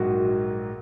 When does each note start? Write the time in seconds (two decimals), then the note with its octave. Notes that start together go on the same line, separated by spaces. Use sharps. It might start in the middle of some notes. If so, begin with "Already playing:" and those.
Already playing: A#1 G#2 F#3 A#3 F#4